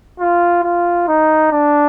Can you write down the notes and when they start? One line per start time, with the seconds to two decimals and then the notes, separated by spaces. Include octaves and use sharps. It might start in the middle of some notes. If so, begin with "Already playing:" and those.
0.20 F4
0.64 F4
1.08 D#4
1.52 D4